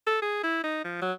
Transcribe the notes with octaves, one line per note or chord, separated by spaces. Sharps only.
A4
G#4
E4
D#4
F3
F#3